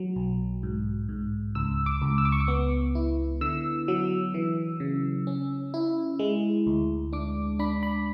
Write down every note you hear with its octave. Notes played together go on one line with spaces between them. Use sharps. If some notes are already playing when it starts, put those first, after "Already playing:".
Already playing: F#3
B1
G#2
G#2
C#2 E6
D6
C#2
E6
D6
C#6
D6
B3
E4
D3 E6
F#3
E3
C#3
C#4
E4
G#3
D2
D4 D6
D4 B5
B5